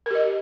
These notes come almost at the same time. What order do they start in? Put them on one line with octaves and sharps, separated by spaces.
A#4 G4 D#5